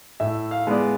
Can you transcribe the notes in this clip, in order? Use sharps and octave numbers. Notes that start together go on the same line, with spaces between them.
A2 E5
F5
G#3 B3 D5